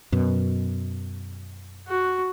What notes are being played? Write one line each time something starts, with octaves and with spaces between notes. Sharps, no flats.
F#2 B2
F#4